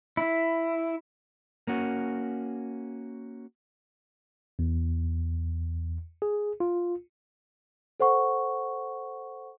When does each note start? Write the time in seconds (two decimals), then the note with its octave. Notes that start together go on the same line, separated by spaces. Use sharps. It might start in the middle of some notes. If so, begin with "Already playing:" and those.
0.17 E4
1.67 A#3 C#4 F#4
4.59 E2
6.22 G#4
6.60 F4
8.00 A4 C5 F#5 C#6